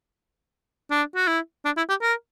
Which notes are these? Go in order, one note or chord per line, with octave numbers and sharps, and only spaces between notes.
D4
F#4
E4
D4
E4
G4
A#4